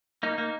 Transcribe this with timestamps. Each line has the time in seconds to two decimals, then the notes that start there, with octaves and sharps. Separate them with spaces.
0.23 A#3 D#4
0.38 A#3